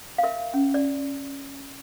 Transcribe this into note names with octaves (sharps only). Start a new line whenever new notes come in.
F5
A#4 E5
C#4
D5